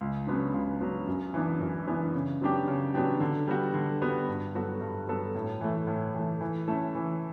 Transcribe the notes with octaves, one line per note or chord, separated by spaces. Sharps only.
C#2
C#3 F#3 B3 D4
C#2
C#3 F#3 B3 D4
F#2
E3 B3 D4
F#2
E3 B3 D4
C#3
F#3 B3 D4 G4
C#3
F#3 B3 D4 G4
D3
G3 B3 F#4
D3
G3 B3 F#4
G2
F#3 B3 F#4 A4
G2
F#3 B3 F#4 A4
A2
E3 A3
A2
E3 A3
E3
A3 C#4 E4 A4
E3